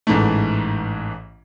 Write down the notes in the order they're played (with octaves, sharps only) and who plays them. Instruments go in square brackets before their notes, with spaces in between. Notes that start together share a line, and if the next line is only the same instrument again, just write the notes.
[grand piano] A1 G#2 E3 A3